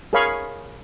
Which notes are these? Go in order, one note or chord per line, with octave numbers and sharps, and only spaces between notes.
G#4 A#4 C#5 F5 B5 C#6